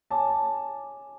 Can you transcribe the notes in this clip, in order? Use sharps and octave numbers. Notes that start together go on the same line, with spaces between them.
C#5 G#5 A5 D6